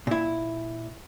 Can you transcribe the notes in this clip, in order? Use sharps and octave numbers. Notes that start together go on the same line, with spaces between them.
A#2 E4